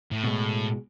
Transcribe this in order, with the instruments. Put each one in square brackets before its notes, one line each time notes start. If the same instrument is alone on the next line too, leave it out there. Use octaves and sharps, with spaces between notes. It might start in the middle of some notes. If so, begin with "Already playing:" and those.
[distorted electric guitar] A2
[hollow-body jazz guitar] B2 G#3